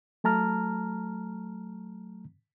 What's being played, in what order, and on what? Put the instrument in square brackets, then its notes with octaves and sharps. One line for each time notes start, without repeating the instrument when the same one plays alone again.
[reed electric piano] F#3 A3 A5 A#5 F6